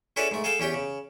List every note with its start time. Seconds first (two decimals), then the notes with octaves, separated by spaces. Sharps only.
0.16 C#4 E4 G#4 A4 B4 D5
0.31 G#2 A3
0.44 G#4 A4 F5 G5 A5
0.60 E2 C#4 G4 G5
0.74 C#3